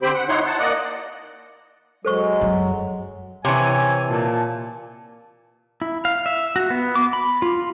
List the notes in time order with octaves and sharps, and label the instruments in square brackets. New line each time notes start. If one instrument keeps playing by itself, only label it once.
[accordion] D3 C4 G4 C5 G5 B5
F#5
D#4 E4 C#5 F#5 C6
F#5 A5
A#3 D5 D#5 F#5
[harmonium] F#3 G#3 [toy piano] A4 C5 C#6
[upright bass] F#2
[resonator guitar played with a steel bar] C3 E3 [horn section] C#5 G#5
[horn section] A#2 A5
[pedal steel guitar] E4
F5
E5
F#4
B3
D6
B5
F4